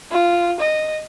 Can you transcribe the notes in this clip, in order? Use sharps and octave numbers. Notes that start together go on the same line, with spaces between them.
F4
D#5